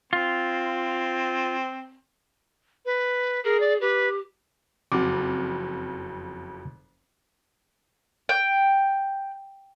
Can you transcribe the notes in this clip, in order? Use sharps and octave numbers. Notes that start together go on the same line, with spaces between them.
C4 F4
B4
G#4 A#4
D5
G4 B4
F#1 F2 F#4 D6
G5